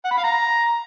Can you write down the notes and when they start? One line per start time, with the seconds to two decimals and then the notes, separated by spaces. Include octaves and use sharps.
0.05 F#5
0.11 B5
0.17 F5
0.24 A#5